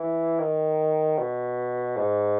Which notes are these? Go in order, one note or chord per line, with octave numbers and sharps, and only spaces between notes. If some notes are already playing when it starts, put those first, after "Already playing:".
Already playing: E3
D#3
B2
G#2